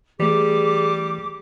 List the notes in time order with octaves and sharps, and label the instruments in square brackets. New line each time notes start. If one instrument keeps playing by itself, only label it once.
[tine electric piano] E3 A3 [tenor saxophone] G3 [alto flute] G#4 [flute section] D6